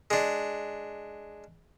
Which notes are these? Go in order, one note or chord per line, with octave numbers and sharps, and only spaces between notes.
G#3 D4